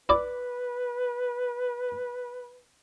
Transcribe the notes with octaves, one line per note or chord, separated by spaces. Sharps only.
E4 B4 D5 D6